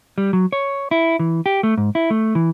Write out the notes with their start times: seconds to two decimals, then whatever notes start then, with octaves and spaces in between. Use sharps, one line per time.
0.18 G3
0.33 F#3
0.52 C#5
0.91 E4
1.19 E3
1.46 G4
1.63 A3
1.77 G#2
1.95 E4
2.10 A3
2.35 E3